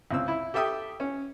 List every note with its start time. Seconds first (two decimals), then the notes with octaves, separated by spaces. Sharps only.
0.11 C#2 C4 E6
0.28 E4
0.54 G4 A4 E5 G5 D#6
1.00 C#4